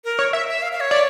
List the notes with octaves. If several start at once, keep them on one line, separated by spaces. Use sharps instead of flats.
A#4
C#5
E5
E5
F5
F5
C#5
D5